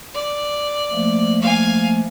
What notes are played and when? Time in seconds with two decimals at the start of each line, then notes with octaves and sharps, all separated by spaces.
0.14 D5
0.93 F3 A3 A#3
1.41 F5 G#5